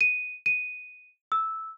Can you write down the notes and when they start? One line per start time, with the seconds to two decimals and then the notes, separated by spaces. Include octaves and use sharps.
0.01 D#7
0.46 D#7
1.32 E6